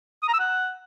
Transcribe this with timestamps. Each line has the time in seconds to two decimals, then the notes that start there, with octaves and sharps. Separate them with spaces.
0.23 D#6
0.28 A#5
0.34 E6
0.39 F#5